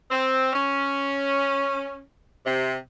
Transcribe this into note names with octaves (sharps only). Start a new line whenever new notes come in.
C4
C#4
C3